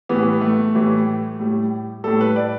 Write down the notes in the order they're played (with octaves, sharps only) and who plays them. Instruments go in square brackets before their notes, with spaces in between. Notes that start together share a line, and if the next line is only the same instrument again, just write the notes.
[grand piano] A2 E3 G3 B3
A3
A2 E3 G3
A2 G3
A2 G3 A4
B4
D5